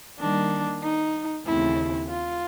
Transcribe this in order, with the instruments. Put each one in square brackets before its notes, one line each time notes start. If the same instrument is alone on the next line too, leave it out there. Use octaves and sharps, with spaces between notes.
[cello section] D#3 G3 A#3 [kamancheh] D4
[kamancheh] D#4
[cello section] D#2 C#3 E3 A3 C4 [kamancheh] E4
[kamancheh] F4